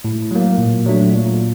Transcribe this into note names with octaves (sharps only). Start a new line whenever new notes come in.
A2
F#3 A#3
A#2
F#3 A3 D4
A#2